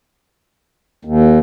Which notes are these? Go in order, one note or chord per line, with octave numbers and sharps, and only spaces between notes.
D#2